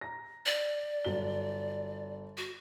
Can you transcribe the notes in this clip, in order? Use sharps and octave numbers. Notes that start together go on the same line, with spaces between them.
A#5 A#6
D5
G1 F#3 G7
F#4